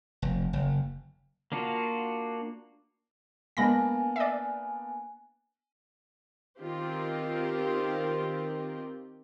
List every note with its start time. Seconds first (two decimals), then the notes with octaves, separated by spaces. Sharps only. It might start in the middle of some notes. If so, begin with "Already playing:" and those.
0.22 F1
0.53 F#1
1.52 A#3 D4 F4 F#4
3.57 G#3 A#3 B3 D4 G#5 B5 A#6
4.16 D5 E5
6.58 D#3 C4 F4 G4